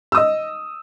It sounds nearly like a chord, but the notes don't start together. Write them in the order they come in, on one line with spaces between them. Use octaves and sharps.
E6 D#6 D#5